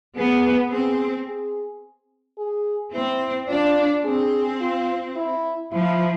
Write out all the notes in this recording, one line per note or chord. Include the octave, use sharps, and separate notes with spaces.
B3 G#4
C4 G#4
G#4
G#4
C4 E4
D4 F4
C4 G#4
F4
E4
F3 E4